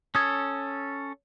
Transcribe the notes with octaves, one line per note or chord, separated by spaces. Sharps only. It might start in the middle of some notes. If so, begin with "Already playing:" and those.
C#4 A4 D#6 G#6